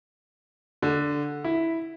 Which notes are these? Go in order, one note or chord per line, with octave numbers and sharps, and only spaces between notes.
D3
E4